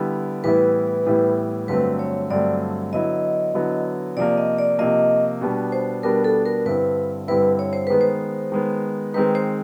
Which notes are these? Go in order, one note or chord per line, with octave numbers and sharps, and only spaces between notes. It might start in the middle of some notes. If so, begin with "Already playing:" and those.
Already playing: D3 G3 B3 E4
A2 E3 G3 B3 E4 B4
A2 E3 G3 B3 E4
G2 D3 F#3 A3 C4 B4
C#5
G2 D3 F#3 A3 C4 D5
D3 F#3 B3 E4 D#5
D3 F#3 B3 E4
C3 F3 A#3 D5
D#5
D5
C3 F3 A#3 D#5
B2 G3 B3 D4
C5
B2 G3 B3 D4 A#4
A4
A#4
G2 D3 G3 C4 E4 B4
G2 D3 G3 C4 E4 B4
C#5
C5
D#3 G#3 B3 B4
C5
D#3 G#3 B3
D#3 G#3 C4 D#4 B4
C5